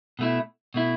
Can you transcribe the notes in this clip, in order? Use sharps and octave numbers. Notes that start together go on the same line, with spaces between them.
B2 A3 E4
B2 A3 E4